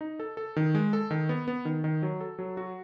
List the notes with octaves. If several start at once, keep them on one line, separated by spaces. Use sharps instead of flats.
D#4
A4
A4
D#3
G#3
A4
D#3
B3
B3
D#3
D#3
F#3
A4
F#3
F#4